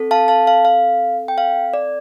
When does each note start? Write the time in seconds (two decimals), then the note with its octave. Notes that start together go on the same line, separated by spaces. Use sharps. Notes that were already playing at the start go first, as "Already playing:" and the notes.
Already playing: C4 A4
0.11 F5 A5
0.28 F5 A5
0.47 F5
0.65 F5
1.28 G5
1.38 F5
1.74 D5